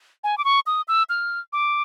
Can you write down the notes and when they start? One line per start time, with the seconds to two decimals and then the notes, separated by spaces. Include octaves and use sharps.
0.24 G#5
0.38 D6
0.45 C#6
0.67 D#6
0.88 E6
1.10 F6
1.53 D6